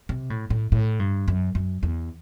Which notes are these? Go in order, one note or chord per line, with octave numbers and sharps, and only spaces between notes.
C3
A2
A2
A2
G2
F#2
F#2
E2